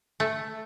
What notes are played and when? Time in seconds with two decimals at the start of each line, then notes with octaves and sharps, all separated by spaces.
0.20 A3